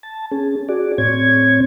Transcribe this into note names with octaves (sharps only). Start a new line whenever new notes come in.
A5
C#4 G#4
F#4 G#4 D5
A2 C4 C#5 G#6